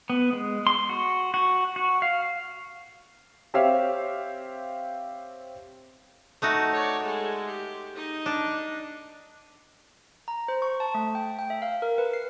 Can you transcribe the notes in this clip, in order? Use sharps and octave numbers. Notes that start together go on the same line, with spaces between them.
B3
G#3
C6
F#4
F#4
F#4
F5
C4 G4 C#5 E5 F5
A3 D#4 F#4
C#5 D5
G#3 A4
G4
D#4 D#5
D4
A#5
C5
C#6
A5
A3
G5
G5
E5
F5
A#4
B4
C7